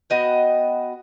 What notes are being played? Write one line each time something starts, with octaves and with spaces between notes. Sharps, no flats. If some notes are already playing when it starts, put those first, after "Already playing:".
B3 F#4 D#5 G5